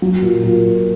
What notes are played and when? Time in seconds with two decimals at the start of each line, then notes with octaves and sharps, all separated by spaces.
0.02 F#3
0.22 A#2
0.43 A#2